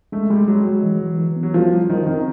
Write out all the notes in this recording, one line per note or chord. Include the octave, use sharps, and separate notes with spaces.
G#3 A3
G3 G#3
F#3 G#3
G#3
E3
E3
E3
B3
F#3
F3 G3
G3
D#3 D#4
D#3 C4